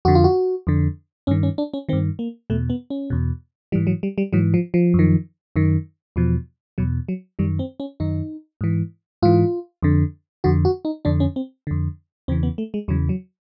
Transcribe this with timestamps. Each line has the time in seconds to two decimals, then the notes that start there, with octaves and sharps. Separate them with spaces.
0.05 F2 D3 F#4
0.15 F4
0.24 F#4
0.67 F2 D3
1.27 G2 D#3 C#4
1.43 C#4
1.58 D4
1.74 C#4
1.89 G2 D#3 C4
2.19 A#3
2.50 E2 B2 A3
2.70 B3
2.90 C#4
3.10 E2 B2
3.72 G#2 E3 G3
3.87 F#3
4.03 G3
4.18 G3
4.33 G#2 E3 F#3
4.54 F3
4.74 F3
4.94 F#2
4.99 D#3
5.56 F#2 D#3
6.16 E2 B2 F3
6.78 E2 B2 F#3
7.09 F#3
7.39 F#2 D#3 G3
7.59 C4
7.80 C#4
8.00 F#2 D#3 D#4
8.61 G#2 E3
9.22 G#2 E3 F4
9.83 F2 D3
10.44 F2 D3 F#4
10.65 F#4
10.85 D#4
11.05 F2 D3 D4
11.20 C#4
11.36 C4
11.67 F2 D3
12.28 E2 C#3 E3 C4
12.43 B3
12.58 A3
12.74 G#3
12.88 E2 C#3 E3 F#3
13.09 F#3